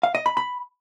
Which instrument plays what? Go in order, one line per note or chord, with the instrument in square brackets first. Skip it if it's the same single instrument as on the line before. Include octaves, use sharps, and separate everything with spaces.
[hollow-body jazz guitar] F5
D#5
B5
B5